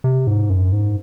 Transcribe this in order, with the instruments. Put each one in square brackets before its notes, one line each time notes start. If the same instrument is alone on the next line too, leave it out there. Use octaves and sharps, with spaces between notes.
[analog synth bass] C3
G#2
F#2
G#2